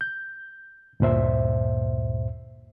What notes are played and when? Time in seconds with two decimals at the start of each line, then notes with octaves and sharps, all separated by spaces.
0.01 G6
1.00 D2 G2 A#2 C5 E5